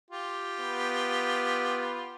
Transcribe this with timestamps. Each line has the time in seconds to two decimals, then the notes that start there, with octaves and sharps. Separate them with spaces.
0.11 F4 G4
0.60 B3